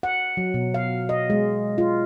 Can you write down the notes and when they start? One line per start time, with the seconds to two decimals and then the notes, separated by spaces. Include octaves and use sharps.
0.03 F#5
0.37 F#3
0.54 B2
0.74 F5
1.09 D#5
1.30 G#3
1.78 F4